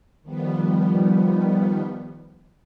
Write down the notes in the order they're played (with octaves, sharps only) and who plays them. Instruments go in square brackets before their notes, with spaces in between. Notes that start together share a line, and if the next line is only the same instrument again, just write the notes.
[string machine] D#3 F3 G3 B3